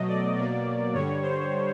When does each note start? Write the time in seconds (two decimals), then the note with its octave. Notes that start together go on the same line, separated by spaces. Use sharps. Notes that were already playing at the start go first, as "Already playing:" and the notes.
Already playing: B2 F#3 A3 D#5
0.09 D5
0.36 B2 F#3 A#3
0.93 G2 D3 G3 C#5
1.22 C5